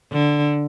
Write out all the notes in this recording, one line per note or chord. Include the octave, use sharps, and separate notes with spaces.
D3